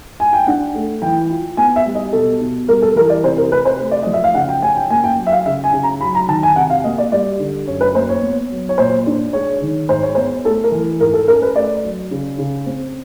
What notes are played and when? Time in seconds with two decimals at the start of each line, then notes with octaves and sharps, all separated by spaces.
0.20 G#5
0.33 G5
0.46 D4 F#5
0.75 A3
1.02 E3 G5
1.30 F4
1.57 B3 G#5
1.76 E5
1.86 G3
1.95 D#5
2.12 B2 A4
2.41 B2
2.68 G3 A#4
2.82 A4
2.96 E3 A#4
3.09 D5
3.24 C3 C5
3.37 A#4
3.52 C3 B4
3.65 C5
3.79 A3
3.91 D5
4.02 F3 D#5
4.13 E5
4.24 F5
4.35 C#3 F#5
4.49 G5
4.62 C#4 G#5
4.76 G5
4.90 A#3 G#5
5.04 G5
5.18 F#3
5.27 E5
5.32 F5
5.46 C#3 E5
5.64 G#5
5.73 C#3
5.83 A#5
6.01 F#3 B5
6.15 A#5
6.28 D#3 A5
6.43 G#5
6.56 C3 F#5
6.70 F5
6.84 A#3 D#5
6.98 D5
7.12 G3 D5
7.39 D3
7.67 F#2 C#5
7.81 B4
7.95 A#3 C5
8.09 C#5
8.23 B3
8.51 F#3
8.69 C#5
8.78 A#2 C5
9.06 D4
9.33 G#3 C#5
9.61 D#3
9.89 G#2 C5
10.02 C#5
10.15 B3 C5
10.45 A3 A4
10.64 A#4
10.72 E3
10.99 G#2 A#4
11.13 A4
11.28 C#4 A#4
11.42 B4
11.56 A3 D5
11.84 F#3
12.11 C#3
12.38 C#3
12.66 C4